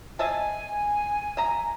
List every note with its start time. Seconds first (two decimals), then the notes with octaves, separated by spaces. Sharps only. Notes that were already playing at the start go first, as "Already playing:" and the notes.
0.19 D#5 E5 G#5 A5
1.37 E5 A#5